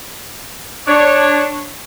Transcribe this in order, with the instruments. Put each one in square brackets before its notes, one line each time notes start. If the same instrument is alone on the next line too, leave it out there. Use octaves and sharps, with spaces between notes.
[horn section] D4 C#5